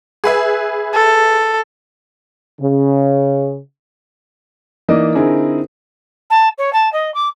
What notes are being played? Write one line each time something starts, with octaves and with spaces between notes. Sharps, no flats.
G#4 B4 E5
A4
C#3
E3 A#3 D#4 D5 D#5
D3 C4 D#4 E4 G#4 A#4
A5
C#5
A5
D#5
D6